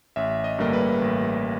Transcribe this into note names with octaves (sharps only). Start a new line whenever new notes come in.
A1 E5
D#5
G2 D3 G3 A#3
B4
A1